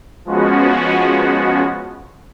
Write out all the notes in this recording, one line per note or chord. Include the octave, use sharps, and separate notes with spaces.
F3 G#3 B3 C#4 F#4